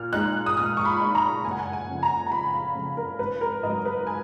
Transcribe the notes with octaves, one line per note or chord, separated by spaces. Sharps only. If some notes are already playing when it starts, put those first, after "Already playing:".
Already playing: A#2 F6
G#3 D#4 F#6
D#6
A#2 F6
C#6
B5
G#3 D#4
A#5
F#1 G#5
F#5
G#5
G#5
F2 C#3
A#5
A#5
F#1 B5
F5
F2 C#3
A#4
G#1 B4
A#4
G#2 F#3 D#5
B4
G#5